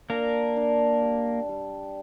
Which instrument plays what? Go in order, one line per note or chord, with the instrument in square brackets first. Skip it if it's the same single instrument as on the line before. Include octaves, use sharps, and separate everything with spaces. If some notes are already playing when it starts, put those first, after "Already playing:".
[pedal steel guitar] A#3 A#4 [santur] D4
[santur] D4
G3
G3